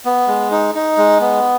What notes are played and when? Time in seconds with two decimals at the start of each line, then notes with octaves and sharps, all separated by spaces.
0.05 B3
0.27 G#3
0.51 D#4
0.75 D#4
0.98 G#3
1.20 B3